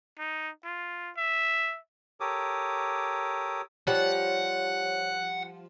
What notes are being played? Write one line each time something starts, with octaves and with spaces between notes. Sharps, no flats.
D#4
F4
E5
G4 A4 A#4 C#5 D6 D#6
F3 G3 C#5 F#5